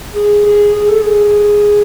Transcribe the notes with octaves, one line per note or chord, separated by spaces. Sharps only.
G#4
G#4
G#4
A4
G#4